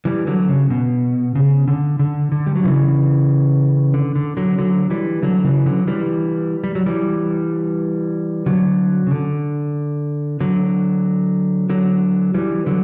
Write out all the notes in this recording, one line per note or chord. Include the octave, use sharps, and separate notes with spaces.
E3 G3
D3 F#3
C#3
B2
C#3
D3
D3
D3
G3
F#3
C#3 E3
D3
D3
D3 F#3
D3 F#3
E3 G3
D3 F#3
C#3 E3
D3 F#3
E3 G3
G3
F#3
E3 G3
D3 F#3
C#3
D3
D3 F#3
D3 F#3
E3 G3
D3 F#3